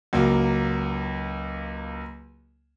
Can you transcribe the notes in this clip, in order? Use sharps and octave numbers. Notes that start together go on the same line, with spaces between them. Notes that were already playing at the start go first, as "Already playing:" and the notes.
C#2 F#3 A#3